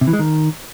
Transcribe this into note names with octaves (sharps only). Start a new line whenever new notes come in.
C3
E3
G#3
D#3